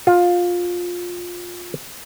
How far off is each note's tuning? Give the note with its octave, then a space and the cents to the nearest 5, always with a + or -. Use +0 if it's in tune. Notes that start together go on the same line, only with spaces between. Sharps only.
F4 +15